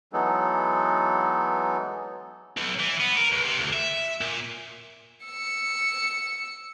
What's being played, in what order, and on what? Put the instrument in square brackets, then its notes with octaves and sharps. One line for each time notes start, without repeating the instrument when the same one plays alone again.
[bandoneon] E3 F#3 G#3 B3 D#4 A4
[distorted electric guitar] B1
E3
B3
A#4
C#2
C3
D2
E5
A#2
[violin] E6 C#7